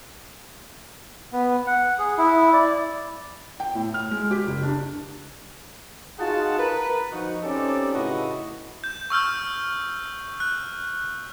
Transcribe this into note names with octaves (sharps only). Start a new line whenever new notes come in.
B3
F#5
G#4
E4
D5
G5
A2
F6
G#3
G4
F#1
D4
D#4 F4 F#4 G#4 F#5 A5
A#4 B4
F3 D#4 F#4
C4 C#4 D#4 G4 A4 D5
A2 C#3 E4 F#4 B4 D#5
G6
C#6 E6 F6 G6
F#6